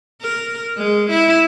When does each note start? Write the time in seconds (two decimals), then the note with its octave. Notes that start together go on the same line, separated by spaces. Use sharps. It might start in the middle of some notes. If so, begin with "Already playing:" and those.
0.22 A#4
0.78 G#3
1.11 E4